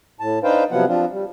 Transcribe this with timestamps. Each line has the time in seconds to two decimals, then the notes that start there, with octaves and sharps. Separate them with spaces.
0.20 A2 A5
0.44 D4 D#4 B4 C5 F5 G5
0.71 C3 F3 F#3 B3 F4 F#5
0.88 F3 C4 D4 F4
1.11 G3